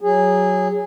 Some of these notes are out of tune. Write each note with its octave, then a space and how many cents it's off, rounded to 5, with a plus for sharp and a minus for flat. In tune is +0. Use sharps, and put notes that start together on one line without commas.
F#3 +0 G#4 -15